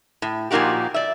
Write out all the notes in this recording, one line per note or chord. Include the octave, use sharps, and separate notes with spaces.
A2
A#2 F3 A#3 D#4 F#4 G4
D5 E5